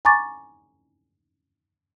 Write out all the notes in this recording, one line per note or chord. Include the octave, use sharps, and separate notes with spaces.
G#5 A#5 C#6 D6 A6